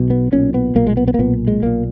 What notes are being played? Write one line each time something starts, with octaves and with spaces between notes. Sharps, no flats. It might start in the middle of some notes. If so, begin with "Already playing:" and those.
Already playing: B1 B2
B3
B1 A#2 C#4
B3
B1 A#2 A#3
G#3
B3
B3
A#3
B1 A#2 B3
G#3
B1 A#2 A#3